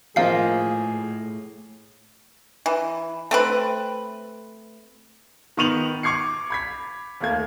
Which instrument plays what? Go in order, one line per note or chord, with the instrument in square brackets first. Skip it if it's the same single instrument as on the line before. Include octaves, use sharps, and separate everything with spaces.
[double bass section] A2 [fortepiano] F3 A#3 D#5 [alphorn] G#4 [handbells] F5 C7
[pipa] E3
A3 C4 B4
[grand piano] D#3 B3 C#6 D#7 F7 F#7
C#6 D6 G#6 C7 C#7
B5 G#6 B6
D#2 A3 A#3 G#6